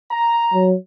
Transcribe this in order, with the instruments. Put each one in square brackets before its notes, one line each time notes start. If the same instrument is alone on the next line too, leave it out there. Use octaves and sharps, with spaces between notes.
[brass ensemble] A#5
[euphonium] F#3